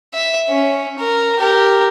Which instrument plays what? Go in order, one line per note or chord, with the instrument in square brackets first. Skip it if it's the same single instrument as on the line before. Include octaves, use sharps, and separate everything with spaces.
[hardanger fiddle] E5
C#4
A#4
G4 A#4